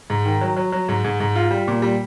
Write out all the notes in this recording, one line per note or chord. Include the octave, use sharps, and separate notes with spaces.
G#2
D#3
F#3
F#3
F#3
G#2
G#2
G#2
F4
G3
A#2
G3